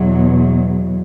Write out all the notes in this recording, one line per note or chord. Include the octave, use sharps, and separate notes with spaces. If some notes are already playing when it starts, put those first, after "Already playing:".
Already playing: E2 B2 F#3